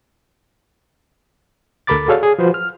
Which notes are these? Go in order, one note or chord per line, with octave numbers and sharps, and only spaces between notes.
D2 A4 A#4 B5 D6 A6
F#4 G#4 A4 C#5 D5 F5
G#4
F3 F#4 B4 C5
F6